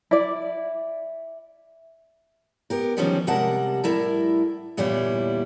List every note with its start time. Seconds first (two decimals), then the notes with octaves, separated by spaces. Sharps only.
0.11 E4 D5
2.70 B3 G4 A#4
2.97 D3 D#3 F3 G3 G#3 C#4
3.27 C3 G3 G#3 A#4 F#5 A5
3.84 A2 G3 E4 A4 A#4
4.77 E2 A#2 D3 G3 E4 C#5